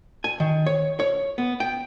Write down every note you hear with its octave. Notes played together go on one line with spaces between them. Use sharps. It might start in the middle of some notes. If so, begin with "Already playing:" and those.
G#5
D#3
C#5
C#5
B3
G5